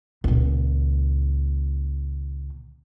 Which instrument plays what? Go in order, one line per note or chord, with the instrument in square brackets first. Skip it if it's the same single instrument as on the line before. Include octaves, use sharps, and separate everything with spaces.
[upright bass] C#2 A#2